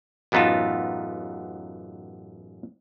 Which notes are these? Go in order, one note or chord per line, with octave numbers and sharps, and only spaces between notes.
A1 F#2 B3 D#4 F4 A5